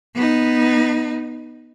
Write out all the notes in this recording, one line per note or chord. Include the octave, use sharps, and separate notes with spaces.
B3 D#4